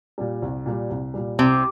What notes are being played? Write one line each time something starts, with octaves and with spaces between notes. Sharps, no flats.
A#2 G3
C2
A#2 G3
C2
A#2 G3
C2 C3